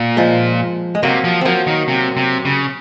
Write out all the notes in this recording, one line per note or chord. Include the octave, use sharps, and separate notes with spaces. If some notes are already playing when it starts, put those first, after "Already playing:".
Already playing: A#2
F3 G#3
G#3
C3 F#3 A#3
F3
C4
F3 F#3 A#3
D#3
C3
C3
C#3